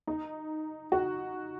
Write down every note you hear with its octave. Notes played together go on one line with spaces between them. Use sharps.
D#4
F#4